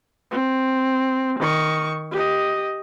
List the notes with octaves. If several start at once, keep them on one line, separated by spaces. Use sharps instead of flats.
C4
D#3 C#6
G4 D#5